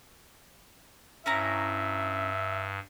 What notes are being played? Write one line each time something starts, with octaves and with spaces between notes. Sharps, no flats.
G2 C#4 E4 E5 A#5